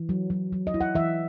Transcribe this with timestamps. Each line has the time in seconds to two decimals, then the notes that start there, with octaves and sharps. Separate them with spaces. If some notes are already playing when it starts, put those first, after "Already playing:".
Already playing: E3
0.09 F#3
0.30 F#3
0.53 F#3
0.67 D#5
0.74 E4
0.81 F#5
0.95 E3 E5